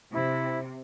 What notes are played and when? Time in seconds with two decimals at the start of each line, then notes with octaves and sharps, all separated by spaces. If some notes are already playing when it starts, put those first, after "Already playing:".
0.13 C3 E4